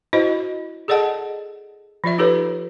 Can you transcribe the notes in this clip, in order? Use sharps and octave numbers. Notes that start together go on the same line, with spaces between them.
E4 F#4 C5 D#5
G#4 A4 D5 D#5 F#5 A5
F3 F4 D5 E5
D#4 G4 A4 B4 C#5